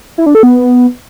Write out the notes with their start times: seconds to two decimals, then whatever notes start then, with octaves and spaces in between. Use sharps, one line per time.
0.18 E4
0.26 D4
0.35 A4
0.43 B3